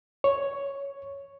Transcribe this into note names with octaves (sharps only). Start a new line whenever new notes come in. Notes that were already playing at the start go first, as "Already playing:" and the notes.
C#5